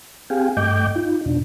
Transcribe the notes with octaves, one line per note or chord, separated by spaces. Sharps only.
C4 G4 G#4 F5 G5 G#5
G2 A3 D#5 G5 D6 G6
D#4 F4
F2 B2 D4